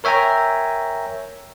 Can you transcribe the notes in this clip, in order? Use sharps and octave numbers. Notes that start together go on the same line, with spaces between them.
A#4 C#5 E5 G5 G#5 A#5